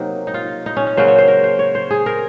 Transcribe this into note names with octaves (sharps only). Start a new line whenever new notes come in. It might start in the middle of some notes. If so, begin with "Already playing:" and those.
Already playing: C3 F#3 A#3 D#4
D#4
F4
D#4
C#4
C#4
C#3 F#3 A#3 C5
C#5
C5
A#4
C5
C#5
C5
G#4
A#4